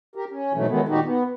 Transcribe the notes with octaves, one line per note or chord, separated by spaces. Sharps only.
G4 A#4
C#4
G#2 B2 E3 F#3 A3
D#3 F#3 G#3 A3 B3
A#2 D#3 D#4 F#4 G4
B3